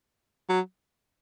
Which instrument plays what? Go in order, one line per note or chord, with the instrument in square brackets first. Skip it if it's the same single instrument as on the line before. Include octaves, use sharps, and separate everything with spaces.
[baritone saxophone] F#3